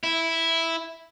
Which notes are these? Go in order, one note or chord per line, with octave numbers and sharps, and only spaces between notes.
E4